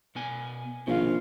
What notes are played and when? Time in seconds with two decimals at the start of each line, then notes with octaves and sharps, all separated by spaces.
0.15 B2 B3 G#5
0.87 A#1 B2 D#3 F4 F5